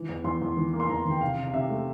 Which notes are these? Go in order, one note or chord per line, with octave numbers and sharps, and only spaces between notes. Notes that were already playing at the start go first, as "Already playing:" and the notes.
Already playing: E3
E2
E2 C6
E2
E3
A#3
C6
E2 A#5
E3
G5
C3 F5
C3
F5
C3 E5
A3